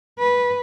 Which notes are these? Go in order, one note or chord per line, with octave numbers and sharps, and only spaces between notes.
B4